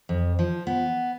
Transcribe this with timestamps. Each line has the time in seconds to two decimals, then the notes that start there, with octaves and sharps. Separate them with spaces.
0.09 F2
0.39 F3
0.67 B3